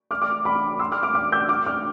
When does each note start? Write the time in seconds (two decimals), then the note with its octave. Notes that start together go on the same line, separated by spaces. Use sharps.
0.11 D6 F6
0.22 D6 F6
0.45 B5 D6
0.79 C6 E6
0.92 D6 F6
1.03 D6 F6
1.15 D6 F6
1.32 E6 G6
1.49 D6 F6
1.66 D6 F6